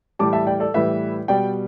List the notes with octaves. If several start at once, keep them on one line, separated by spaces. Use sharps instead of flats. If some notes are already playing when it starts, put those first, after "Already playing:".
A2 E3 G3 A5 D6
E5 A5
D5 G5
A4 D5
A2 E3 G3 B4 E5
B2 G3 D5 G5